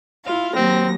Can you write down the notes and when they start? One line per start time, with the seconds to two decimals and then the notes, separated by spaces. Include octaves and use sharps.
0.24 E4 F4 F5
0.55 D#2 F#3 C4 A#6